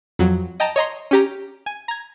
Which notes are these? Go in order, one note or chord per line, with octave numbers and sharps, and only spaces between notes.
F2 F#3
D#5 G5 A5 A#5 D#7
C#5 D#5 A#5 C6
C#4 G4 A#5
G#5
A#5 G#6